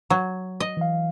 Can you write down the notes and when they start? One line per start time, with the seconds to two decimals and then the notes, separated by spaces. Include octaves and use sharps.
0.10 F#3
0.60 D#5
0.77 E3 F5